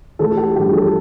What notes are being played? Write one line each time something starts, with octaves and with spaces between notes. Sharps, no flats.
A1 A4
G4
G2 F3 G4
A4